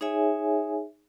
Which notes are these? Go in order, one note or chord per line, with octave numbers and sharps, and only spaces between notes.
D#4 G#4 C#5 E5 G#5